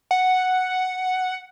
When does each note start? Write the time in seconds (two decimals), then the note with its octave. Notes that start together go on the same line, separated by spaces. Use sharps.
0.11 F#5